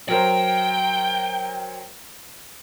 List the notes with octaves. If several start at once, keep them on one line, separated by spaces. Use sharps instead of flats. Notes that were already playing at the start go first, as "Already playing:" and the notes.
F#3 A#4 C5 G5